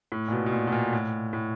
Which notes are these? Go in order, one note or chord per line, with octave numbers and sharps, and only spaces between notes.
A2
A#2
B2
B2
A#2
B2
A#2
A2
A2